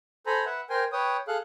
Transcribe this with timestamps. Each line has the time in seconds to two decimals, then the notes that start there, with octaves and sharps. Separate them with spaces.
0.26 A4 C5 G#5 A#5 B5
0.46 B4 E5 F#5
0.70 A#4 C5 G5 G#5 C6
0.92 B4 C#5 G5 D#6
1.28 G#4 A4 F5 F#6